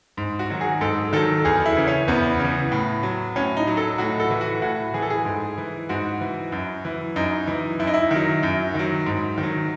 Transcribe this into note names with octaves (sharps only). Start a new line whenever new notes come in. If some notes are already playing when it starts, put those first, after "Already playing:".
G#2
F#4
D#3 F#3
G#4
G#2 A4
D#3 F#3 A4
E2 G#4
E4
C#3 E3
C#4
E2 B3
C#3
E3
A2
F#3
A2 C#4
D#4
F#3
A4
A2 F#4
A4
E3
F#4
A2 F#4
E3 G#4
A4
G#4
G#2
E3
G#2 F#4
E3
F#2
E3
F#2 D#4
E3
F#2 E4
D#4
E4
D#3 F#3
F#2
D#3
F#3
G#2
D#3
F#3